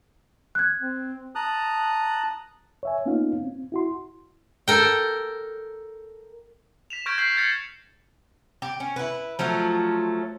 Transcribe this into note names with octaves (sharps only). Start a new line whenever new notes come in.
F#6 G#6
C4
A5 A#5 D#6 F#6
C#5 E5 G#5
A#3 B3 C#4 D#4 F4 F5
C4
E4 F#4 C6
A4 A#4 G5
B6 E7 F7
C#6 F6 G6 G#6 A#6 D7
E6 G6 G#6 B6 C7 F#7
F6 G#6 A6 B6 C#7
G4
C#4
E4 B4
F3 F#3 A3 F4